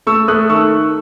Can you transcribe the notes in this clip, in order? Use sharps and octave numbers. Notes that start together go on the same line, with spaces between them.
A3 C#6 E6
A3 D#6 F#6
D#3 C#6 E6